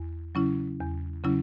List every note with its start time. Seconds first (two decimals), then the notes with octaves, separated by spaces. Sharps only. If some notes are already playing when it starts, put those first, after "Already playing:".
Already playing: E2
0.35 C#3 F#3 C#4 E4
0.80 E2
1.24 C#3 F#3 C#4 E4